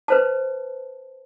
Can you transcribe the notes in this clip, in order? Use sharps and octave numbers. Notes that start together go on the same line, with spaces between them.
B4 C5 A5